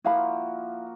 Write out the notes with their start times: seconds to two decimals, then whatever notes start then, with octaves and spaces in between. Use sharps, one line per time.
0.04 F3 A#3 E4 F#4 F5 B5